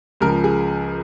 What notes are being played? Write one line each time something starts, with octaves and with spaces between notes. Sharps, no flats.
C#2 C#3 F3 A#4
G#4